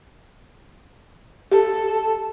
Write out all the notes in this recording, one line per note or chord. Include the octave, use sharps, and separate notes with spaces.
G4 A4